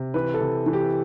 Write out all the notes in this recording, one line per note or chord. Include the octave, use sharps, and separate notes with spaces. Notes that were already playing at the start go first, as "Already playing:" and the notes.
Already playing: C3
E3 B4
A4
C3
E3
G4